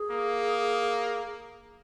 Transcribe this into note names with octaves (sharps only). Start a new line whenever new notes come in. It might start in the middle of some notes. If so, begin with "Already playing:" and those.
Already playing: G#4
A#3